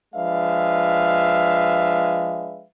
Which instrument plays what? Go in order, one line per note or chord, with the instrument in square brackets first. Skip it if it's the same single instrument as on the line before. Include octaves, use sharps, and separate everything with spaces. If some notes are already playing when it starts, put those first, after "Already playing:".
[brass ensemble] F3 G#3 D4 B4 E5 F5